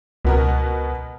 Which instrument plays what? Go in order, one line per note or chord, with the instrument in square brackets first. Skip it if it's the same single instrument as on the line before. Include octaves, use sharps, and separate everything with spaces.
[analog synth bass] C#2 [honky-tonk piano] B2 B3 A#4